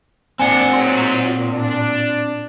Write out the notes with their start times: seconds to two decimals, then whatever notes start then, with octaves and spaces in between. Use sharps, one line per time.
0.39 A#2 C4 D4 F#5 G#5
0.73 G#2 F#3 C6
1.50 D4